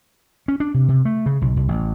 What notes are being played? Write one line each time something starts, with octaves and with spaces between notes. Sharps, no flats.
C#4
D4
C3
C3
A3
C#3
B1
C2
A1